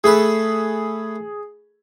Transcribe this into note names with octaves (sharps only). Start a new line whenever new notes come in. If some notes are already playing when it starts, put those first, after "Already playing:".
A3 G#4 A4 B4